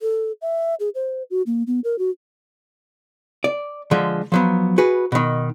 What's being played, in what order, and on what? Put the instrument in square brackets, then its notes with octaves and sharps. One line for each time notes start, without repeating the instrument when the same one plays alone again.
[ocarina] A4
E5
G#4
C5
F#4
A#3
B3
A#4
F#4
[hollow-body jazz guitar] D5
D3 F3 G#3
F3 F#3 B3
F#4 G#4 B4
B2 D#3